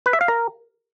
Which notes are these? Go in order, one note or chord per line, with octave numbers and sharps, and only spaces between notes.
B4
E5
F5
A#4